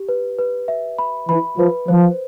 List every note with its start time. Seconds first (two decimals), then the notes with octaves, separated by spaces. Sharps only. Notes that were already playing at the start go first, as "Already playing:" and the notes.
Already playing: G4
0.09 B4
0.39 B4
0.68 E5
0.98 B5
1.29 E3 B5
1.58 F3 B4
1.88 F3 C5